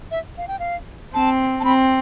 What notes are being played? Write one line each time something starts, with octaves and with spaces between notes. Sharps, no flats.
E5
F5
G5
F5
C4 A5
A5
C4 B5